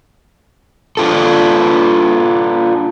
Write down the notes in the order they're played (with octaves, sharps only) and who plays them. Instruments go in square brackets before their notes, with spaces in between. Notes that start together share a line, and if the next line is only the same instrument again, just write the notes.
[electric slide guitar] D4 F4 A4